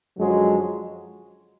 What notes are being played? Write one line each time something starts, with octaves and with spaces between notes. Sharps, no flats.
F#2 D3 F3 F#3 G#3